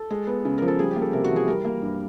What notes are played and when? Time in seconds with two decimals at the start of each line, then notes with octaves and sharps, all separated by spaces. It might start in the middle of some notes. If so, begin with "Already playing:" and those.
Already playing: A4
0.10 G#3
0.27 B3
0.45 C#3
0.58 F3 A#4
0.68 A4
0.79 G3 G#4
0.91 G4
0.96 A#3
1.02 A4
1.13 C3 A#4
1.24 F#4
1.31 E3
1.36 G#4
1.48 G3 A#4
1.65 A#3
1.82 G2